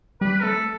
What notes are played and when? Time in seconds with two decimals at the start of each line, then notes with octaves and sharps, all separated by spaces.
0.21 G3 B4
0.43 A3 A4